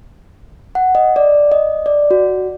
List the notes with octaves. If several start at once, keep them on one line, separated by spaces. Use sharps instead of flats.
F#5
D#5
D5
D#5
D5
F#4